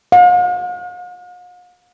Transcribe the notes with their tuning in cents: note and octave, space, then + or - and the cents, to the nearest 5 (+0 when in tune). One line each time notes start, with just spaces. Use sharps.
F5 +45